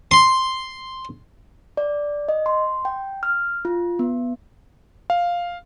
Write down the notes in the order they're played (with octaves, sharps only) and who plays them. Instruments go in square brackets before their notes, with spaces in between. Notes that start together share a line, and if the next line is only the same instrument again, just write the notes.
[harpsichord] C6
[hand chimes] D5
D#5
C6
G5
F6
F4
B3
[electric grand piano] F5